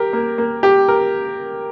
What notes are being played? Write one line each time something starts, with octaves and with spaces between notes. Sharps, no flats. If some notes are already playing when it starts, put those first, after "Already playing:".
Already playing: G4 A#4
A#3
A#3
G4
A#4